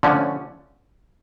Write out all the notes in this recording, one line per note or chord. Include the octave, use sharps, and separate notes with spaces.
D3 F3 A3 C#4